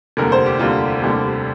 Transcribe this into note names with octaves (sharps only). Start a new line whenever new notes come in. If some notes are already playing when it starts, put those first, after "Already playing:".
F1 D#2 D3 G3 A#4
C5
G4
F1 D#2 D3 G3 F4
F1 D#2 D3 G3